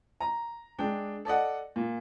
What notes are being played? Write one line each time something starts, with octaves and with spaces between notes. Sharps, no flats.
A#5
G#3 D4 G5
A4 D5 D#5 F#5
A#2